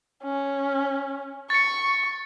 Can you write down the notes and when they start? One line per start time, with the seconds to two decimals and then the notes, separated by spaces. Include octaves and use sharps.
0.23 C#4
1.50 C#6 A6 C#7